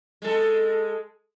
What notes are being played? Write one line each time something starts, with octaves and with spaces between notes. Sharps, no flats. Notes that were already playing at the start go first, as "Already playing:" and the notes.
G#3 A4